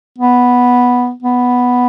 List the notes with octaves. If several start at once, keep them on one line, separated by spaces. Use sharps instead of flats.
B3
B3